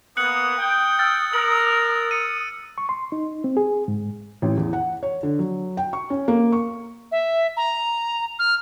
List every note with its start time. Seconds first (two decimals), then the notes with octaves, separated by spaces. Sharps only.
0.17 A#3 B3 D#6 F#6 C#7 F#7
0.58 G5
0.99 E6 F6 A6
1.33 A#4 F#7
2.11 C#7 D#7
2.78 C#6
2.89 C6
3.12 D#4
3.44 C4
3.57 G#4
3.88 G#2
4.42 A1
4.57 E2
4.73 F#5
5.03 C#5
5.23 D3
5.39 F#3
5.77 G5
5.93 C#6
6.10 C#4
6.28 A#3
6.52 C#6
7.12 E5
7.57 A#5
8.39 F6